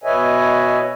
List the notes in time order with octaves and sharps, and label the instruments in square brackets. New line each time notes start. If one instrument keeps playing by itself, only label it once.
[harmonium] B2 B4 C#5 D#5 E5 G#5